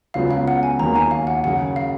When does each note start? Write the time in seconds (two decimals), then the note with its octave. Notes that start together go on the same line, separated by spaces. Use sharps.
0.14 C#2 C#3 F#3 B3 F4 F5
0.31 F5
0.48 F#5
0.63 G#5
0.79 D#2 D#3 F#3 A#3 A#5
0.96 G#5
1.11 F5
1.27 F#5
1.44 F#2 C#3 F#3 F#5
1.76 F5